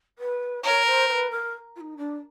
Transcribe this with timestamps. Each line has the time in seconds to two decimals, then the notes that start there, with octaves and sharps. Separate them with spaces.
0.18 B4
0.63 A#4 C#5
0.86 C5
1.08 C5
1.12 B4
1.31 A#4
1.76 F4
1.80 D#4
1.97 D4